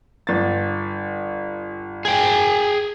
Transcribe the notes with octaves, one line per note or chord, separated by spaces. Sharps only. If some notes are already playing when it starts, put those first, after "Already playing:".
G1 A6
G#4 G5